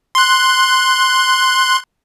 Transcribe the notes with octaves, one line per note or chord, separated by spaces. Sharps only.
C6 F#6